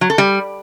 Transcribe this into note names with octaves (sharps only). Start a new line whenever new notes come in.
F#3
A4
G3